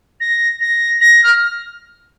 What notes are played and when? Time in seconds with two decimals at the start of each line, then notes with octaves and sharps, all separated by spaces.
0.20 A#6
0.61 A#6
1.01 A#6
1.24 F6